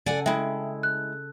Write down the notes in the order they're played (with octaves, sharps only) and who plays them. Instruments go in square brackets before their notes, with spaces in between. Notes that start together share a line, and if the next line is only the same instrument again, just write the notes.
[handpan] C#3 A4 [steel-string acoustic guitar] D5 F#5 G#5
[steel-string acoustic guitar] G#3 E4 [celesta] E5 G5
[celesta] F#6